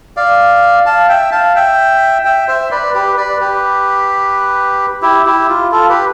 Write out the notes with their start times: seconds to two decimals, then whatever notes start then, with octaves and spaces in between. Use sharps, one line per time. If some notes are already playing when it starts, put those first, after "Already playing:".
0.17 D5 F5
0.86 F5 A5
1.09 E5 G5
1.32 F5 A5
1.56 E5 G5
2.25 E5 G5
2.48 C5 E5
2.71 B4 D5
2.94 G4 B4
3.17 B4 D5
3.40 G4 B4
5.02 E4 G4
5.26 E4 G4
5.49 F4
5.72 F4 A4
5.89 G4 B4